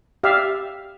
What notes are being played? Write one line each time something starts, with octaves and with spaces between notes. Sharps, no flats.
G4 D5 E5 F5